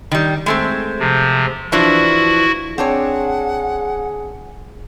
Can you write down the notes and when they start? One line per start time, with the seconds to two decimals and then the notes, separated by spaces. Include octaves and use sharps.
0.11 D#3 G3
0.46 G#3 A3 C4
0.99 C3 F3
1.72 E3 F3 D4 E4 F#4
2.78 C4 D4 G#4 C#5 F#5